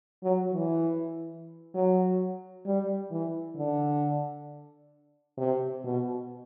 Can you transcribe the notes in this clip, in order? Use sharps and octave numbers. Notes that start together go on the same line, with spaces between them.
F#3
E3
F#3
G3
E3
D3
C3
B2